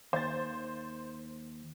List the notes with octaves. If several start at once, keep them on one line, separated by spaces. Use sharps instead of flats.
D#2 C5 A6